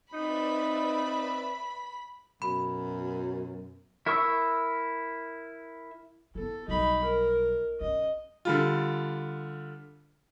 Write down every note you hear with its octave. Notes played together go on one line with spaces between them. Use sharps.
C4 D#4 B4 D5 E5 B5
F#2 B2 B5
E4 A#4 E5 C#6 E6
B3 E4 A4
B1 G3 D#4 B5
A#4
B1 C#4 D#5
D3 G3 F4